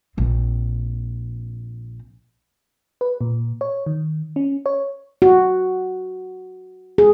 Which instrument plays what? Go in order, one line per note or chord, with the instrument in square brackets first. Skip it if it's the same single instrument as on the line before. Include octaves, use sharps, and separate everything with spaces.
[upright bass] A#1 C4
[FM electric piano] B4
A#2
C#5
D#3
C#4
C#5
[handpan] F#4
G#4